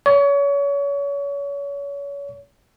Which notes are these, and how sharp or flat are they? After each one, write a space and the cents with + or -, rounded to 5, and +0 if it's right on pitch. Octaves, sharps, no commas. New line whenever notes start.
C#5 +30